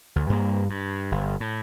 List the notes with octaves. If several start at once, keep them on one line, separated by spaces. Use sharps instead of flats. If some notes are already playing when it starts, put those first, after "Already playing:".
D2
G2 A#3
G2
G1
A2